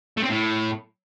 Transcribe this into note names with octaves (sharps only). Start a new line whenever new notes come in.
A3
C4
A2